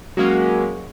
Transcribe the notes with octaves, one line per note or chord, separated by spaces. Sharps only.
F#3 G#3 A#3 C#4